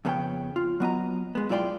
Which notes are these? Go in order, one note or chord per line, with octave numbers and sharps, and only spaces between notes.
F2 C#3 B3 A4 C#5 G5
F4
F#3 B3 D#5 A#5
G#3 B3
F#2 E4 F4 D5 G5 C6